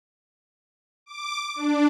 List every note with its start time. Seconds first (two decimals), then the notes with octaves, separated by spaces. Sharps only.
1.06 D6
1.55 D4